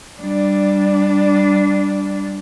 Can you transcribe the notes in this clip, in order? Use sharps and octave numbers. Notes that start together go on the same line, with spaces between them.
G3 D4